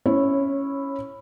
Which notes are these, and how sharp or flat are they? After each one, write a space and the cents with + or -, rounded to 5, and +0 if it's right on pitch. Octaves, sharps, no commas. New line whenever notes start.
C#4 +0 E4 +0 C#5 -20